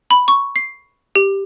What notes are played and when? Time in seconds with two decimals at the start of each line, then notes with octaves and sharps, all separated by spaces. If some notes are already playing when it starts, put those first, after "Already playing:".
0.11 B5
0.28 C#6
0.56 C7
1.16 G4